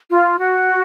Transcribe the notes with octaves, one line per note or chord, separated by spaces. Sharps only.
F4
F#4